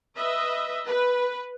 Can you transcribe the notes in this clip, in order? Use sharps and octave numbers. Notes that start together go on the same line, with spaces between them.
B4 D#5 E5
B4